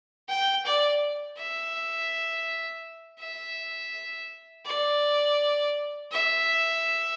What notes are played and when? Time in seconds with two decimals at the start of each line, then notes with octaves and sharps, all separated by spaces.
0.29 G5
0.65 D5
1.38 E5
3.20 E5
4.66 D5
6.12 E5